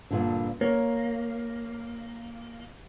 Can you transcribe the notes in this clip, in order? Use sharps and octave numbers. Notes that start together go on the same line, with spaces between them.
G2 A#2 D3
A#3 C#5